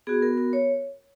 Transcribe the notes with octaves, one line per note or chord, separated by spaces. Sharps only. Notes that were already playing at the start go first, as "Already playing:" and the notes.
B3 F#4 G#4
A#4
A#4
C#5